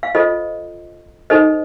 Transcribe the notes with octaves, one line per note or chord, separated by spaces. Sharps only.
F5
F4 A4 C5 D#5
D#4 A4 C5 D#5